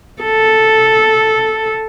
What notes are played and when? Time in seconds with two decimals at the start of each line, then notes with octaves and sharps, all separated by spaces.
0.23 A4